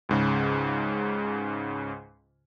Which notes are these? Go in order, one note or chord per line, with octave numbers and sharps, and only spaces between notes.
C#2 G#2 C#3